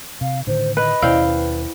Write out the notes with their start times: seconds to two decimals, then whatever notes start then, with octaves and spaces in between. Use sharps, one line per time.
0.21 C3 F5
0.47 A2 D3 D#3 C5
0.77 B4 D#5
1.02 D#2 B2 C#4 E4 C5 D5 F5 G5
1.24 B4